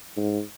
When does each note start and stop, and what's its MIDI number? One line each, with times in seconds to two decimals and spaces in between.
0.17 0.41 44